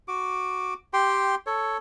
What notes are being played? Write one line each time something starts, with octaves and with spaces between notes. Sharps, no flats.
F#4 D6
G4 G5 C6
A4 C#5